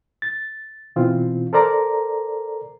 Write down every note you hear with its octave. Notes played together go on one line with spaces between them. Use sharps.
A6
B2 E3 C4 F4
A4 A#4 C5 D5 A#5